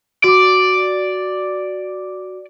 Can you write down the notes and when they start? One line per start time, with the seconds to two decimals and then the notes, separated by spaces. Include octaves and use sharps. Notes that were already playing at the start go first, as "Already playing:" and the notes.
0.24 F#4 D5 D6